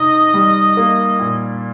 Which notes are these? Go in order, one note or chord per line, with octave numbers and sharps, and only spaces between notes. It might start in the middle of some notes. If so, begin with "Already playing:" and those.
Already playing: C3 C4 D#4 D#5
G3
A#3
A#2